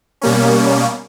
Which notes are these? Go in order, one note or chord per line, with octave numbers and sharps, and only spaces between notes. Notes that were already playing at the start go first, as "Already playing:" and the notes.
B2 G3 A#3 C#4